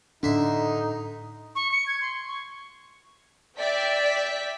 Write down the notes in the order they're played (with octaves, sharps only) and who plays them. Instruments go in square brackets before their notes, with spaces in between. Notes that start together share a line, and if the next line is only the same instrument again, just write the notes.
[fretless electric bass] A2 D4 [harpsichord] D3 E5 C6 [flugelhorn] D#4
[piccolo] C#6
C#7
G#6
C6
C#6
[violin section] D5 E5 G5 B6